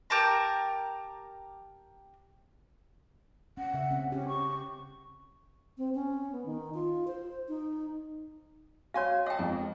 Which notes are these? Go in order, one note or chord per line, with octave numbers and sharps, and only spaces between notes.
G4 A#4 A5 A#5
C#4 F#5
C#3 E5
C4 C#4
C#4 G4
C#6
C4
C#4
B3
D#3
F4
C5
D#4
F#4 C#5 F5 G#5 C6
D#5 F#5 G5 A5
F2 G#2